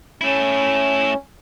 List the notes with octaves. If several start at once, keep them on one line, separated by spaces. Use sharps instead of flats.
A3 C#4 E4